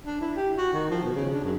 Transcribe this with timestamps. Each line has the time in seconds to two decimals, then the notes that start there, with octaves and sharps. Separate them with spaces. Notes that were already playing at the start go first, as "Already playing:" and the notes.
0.05 D4
0.21 E4
0.36 G4
0.57 F#4
0.73 D#3
0.90 F3
1.03 B2
1.15 C#3
1.32 D4
1.44 F#2